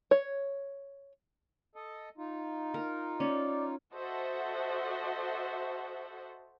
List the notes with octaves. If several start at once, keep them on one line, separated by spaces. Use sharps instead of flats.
C#5
A4 D#5
D#4 F4
A#4
C#4 D5
F#4 A4 C5 D#5 E5 F#5